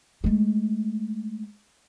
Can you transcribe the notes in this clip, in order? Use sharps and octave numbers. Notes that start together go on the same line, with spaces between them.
G#3 A3